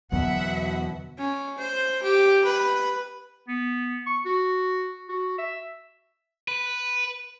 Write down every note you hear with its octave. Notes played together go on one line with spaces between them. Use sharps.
E2 B2 D3 F#3 B3 E5 F#5
C#4
C5
G4
B4
B3
C#6
F#4
F#4
E5
B4